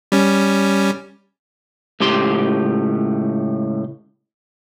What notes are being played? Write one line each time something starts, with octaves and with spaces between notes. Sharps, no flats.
G3 C#4
C#2 A2 G4 C6